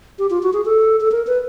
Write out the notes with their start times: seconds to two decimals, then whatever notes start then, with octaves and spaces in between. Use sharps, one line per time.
0.19 G4
0.30 F4
0.43 F#4
0.53 G#4
0.65 A4
1.01 A4
1.12 A#4
1.27 B4